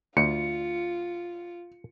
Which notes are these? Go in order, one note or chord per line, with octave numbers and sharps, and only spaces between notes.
D2 F4 C#7